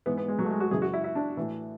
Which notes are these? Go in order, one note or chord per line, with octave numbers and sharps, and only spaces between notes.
G#2 E3 B3
B3
G#3
F#3
A3
G#3
F#4
F#2 C#3 E3 G#4
F#4
E4
E4
D4
A2 E3